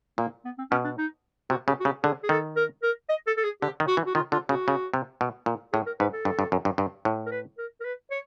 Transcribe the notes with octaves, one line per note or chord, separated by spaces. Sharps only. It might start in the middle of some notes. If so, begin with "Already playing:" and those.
A#2 A#3
B3
C4
B2 C#4
D4
D#4
C3 F#4
C#3 G4
F#4
C#3 G4
D3 G#4
G#4
D#3 A4
A#4
A#4
D#5
A4
A4
G#4
D3 G4
D#3
F#4
E3
F#4
D#3 F4
D3 F4
C#3 F#4
C#3
C3
B2
A#2
A2 G#4
A#4
G#2 B4
A4
G2
G2
F#2
G2
G2
A2
A#4
B4
A#4
A#4
B4
C#5